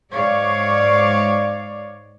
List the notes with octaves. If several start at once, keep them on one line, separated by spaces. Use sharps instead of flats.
G#2 C#5 D5 F5